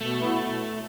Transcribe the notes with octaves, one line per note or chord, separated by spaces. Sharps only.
B2 A3
F#3 B3 E4
B2